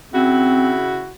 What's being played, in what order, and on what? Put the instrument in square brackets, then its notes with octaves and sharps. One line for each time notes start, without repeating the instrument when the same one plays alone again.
[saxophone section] C#3 E4 F#4 [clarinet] C4